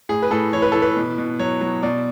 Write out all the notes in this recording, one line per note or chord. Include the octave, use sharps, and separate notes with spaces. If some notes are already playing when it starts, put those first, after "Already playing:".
A2 G#4
B4
A2 A4
E3 C#5
B4
E3 A4
B4
B2
B2
F#3 C#5
F#3
B2 D5